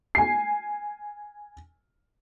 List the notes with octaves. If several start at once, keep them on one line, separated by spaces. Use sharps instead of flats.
G#5 C7